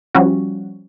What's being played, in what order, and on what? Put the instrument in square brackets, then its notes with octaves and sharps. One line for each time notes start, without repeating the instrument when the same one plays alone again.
[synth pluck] F3 G3 C#4 F#4